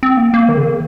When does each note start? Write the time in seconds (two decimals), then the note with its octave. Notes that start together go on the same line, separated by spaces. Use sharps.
0.03 C4
0.17 A#3
0.34 A#3
0.49 D#3
0.57 C#3
0.64 D#3